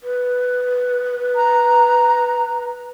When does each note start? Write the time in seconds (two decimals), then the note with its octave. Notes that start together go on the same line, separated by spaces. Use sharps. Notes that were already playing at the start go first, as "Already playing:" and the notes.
0.03 B4
1.36 A#5